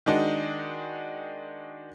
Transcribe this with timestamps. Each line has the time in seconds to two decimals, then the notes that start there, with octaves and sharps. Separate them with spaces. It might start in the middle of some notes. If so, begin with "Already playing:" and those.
0.06 D#3 G#3 D4 D#4 F#4